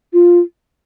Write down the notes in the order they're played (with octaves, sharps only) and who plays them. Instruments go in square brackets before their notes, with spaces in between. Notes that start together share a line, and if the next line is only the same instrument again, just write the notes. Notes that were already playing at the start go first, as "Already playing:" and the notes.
[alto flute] F4